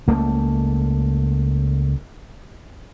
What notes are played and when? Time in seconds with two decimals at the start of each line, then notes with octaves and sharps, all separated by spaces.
0.07 C#2 A3 A#3